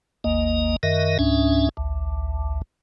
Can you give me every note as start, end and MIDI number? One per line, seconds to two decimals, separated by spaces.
0.24 0.76 32
0.24 0.76 39
0.24 0.76 58
0.24 0.76 75
0.83 1.18 42
0.83 1.18 51
0.83 1.18 70
0.83 1.18 75
0.83 1.18 76
1.19 1.69 37
1.19 1.69 44
1.19 1.69 61
1.19 1.69 62
1.19 1.69 76
1.77 2.62 33
1.77 2.62 38